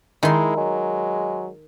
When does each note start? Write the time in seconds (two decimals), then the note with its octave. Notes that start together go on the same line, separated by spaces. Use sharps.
0.23 D#3 G#3 E4 C6
0.57 F#3 G#3